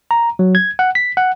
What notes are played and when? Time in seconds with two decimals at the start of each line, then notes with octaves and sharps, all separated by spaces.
0.11 A#5
0.39 F#3
0.55 G#6
0.79 F#5
0.95 B6
1.17 F#5